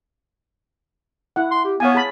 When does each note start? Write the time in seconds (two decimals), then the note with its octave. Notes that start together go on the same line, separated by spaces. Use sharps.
1.36 E4 F#5
1.51 C6
1.65 G4
1.80 B3 C#5 F5 G#5
1.94 G#4 A5 B5